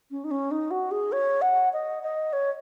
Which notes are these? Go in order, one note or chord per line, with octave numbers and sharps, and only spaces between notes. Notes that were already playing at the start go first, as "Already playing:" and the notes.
C#4
D#4
C#4
D#4
F#4
G#4
C#5
F#5
D#5
D#5
C#5